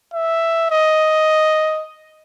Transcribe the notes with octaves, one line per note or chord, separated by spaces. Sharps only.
E5
D#5